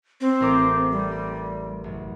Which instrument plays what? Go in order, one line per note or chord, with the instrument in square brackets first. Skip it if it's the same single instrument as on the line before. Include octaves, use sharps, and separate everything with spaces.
[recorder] C4
[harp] A1 A#4 D6
[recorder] G3
[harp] C4
F#1